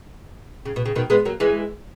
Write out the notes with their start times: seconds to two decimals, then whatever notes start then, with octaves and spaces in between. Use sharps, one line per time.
0.65 C#3
0.76 B2
0.86 C#3
0.95 B2 D#3
1.10 G#3 B3
1.25 F#3 A#3
1.40 E3 G#3